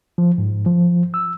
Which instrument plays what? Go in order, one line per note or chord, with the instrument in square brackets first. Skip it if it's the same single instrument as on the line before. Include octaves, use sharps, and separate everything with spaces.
[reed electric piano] F3
G#2
F3
E6